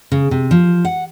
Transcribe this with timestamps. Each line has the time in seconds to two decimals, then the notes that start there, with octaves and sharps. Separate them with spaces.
0.12 C#3
0.31 C3
0.51 F3
0.85 F#5